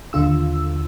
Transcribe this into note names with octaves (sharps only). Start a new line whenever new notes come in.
D#2 D3 F4 E6